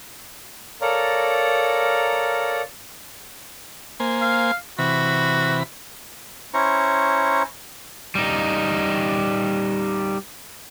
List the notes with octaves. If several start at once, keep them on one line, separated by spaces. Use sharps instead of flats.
A4 A#4 C#5 D5 F5 A#5
A#3 C5 G#5
F5
C3 E3 F#4 B5
C#4 E4 C5 A#5 C#6
G3 D#4